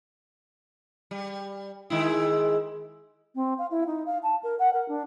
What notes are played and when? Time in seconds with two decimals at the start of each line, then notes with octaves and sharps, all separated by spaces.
1.11 G3
1.90 D#3 G#3 E4
3.35 C4
3.59 F5
3.71 E4
3.87 D#4
4.06 F5
4.23 A5
4.44 A#4
4.59 F#5
4.74 A#4
4.89 D4